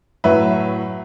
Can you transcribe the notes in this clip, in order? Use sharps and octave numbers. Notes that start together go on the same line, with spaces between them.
A2 F#3 B4 E5